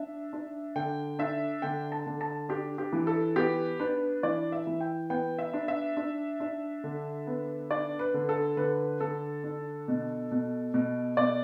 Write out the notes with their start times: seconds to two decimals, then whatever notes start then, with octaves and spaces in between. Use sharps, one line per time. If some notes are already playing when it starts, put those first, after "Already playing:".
Already playing: D4 E5
0.33 D4
0.76 D3 G5
1.19 D4 E5
1.62 D3 G5
1.92 A5
2.06 D3
2.21 A5
2.49 D4 G4
2.78 G4
2.93 E3
3.07 A4
3.36 B3 G4
3.80 D4 B4
4.23 E3 D5
4.52 E5
4.67 E3
4.81 G5
5.10 B3 G5
5.39 E5
5.53 D4
5.68 E5
5.97 D4
6.40 D4
6.84 D3
7.27 B3
7.70 D4 D5
7.99 B4
8.14 D3
8.29 A4
8.57 D3 B4
9.00 D3 A4
9.44 D4
9.88 B2
10.31 B2
10.74 B2
11.17 B2 D5